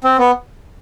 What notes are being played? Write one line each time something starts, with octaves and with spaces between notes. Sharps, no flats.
C4
B3